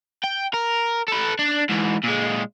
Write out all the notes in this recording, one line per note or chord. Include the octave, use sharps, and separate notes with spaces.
G5
A#4
A4 B4
D4
G#2 E3
A#2 G#3